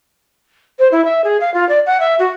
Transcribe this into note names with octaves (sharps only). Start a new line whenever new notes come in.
C5
E4
E5
G#4
F5
F4
D5
F#5
E5
F#4